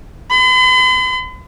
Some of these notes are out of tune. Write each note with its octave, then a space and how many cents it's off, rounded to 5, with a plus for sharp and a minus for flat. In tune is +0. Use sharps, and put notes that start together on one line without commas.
B5 +45